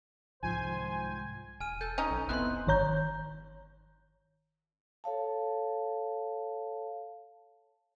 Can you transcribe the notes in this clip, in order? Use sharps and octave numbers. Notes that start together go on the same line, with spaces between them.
C2 G#2 D#3 F3 G#3 C5 G#5
E1 G#5 F6 D#7
A4 G6
C#4 D#4
B1
F1 B3 C4 E4 C6 F#6
G1 D#3 C#5 A#5 G6
A4 C#5 F5 A5